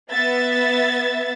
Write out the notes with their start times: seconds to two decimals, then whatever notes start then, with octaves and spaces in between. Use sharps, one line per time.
0.12 B3 E5 A6